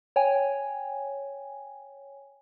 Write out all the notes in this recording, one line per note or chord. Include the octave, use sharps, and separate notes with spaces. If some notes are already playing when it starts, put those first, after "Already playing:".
C#5 G5 G#5